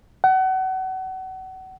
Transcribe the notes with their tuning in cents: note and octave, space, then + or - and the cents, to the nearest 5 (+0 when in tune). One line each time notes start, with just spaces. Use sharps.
F#5 +30